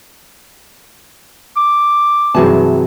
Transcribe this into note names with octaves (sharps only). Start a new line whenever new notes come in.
D6
G2 C3 E3 F#3 G#4 A5